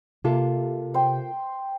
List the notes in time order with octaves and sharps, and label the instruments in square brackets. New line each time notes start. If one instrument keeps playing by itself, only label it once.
[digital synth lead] C3 [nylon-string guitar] A#3 F4 A4
[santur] C5 G5